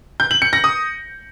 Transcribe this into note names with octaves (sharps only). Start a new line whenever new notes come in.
G6
F#7
C#7
A#6
D#6